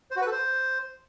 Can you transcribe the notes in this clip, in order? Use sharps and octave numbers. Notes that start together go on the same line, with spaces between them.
C5
F#4
B4
A4
C5